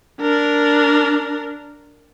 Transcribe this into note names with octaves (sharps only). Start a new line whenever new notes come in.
D4 A#4